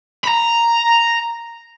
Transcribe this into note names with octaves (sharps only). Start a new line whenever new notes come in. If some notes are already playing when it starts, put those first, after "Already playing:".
A#5 B5